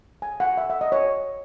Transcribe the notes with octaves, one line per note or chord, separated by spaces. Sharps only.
G#5
F#5
E5
E5
D#5
C#5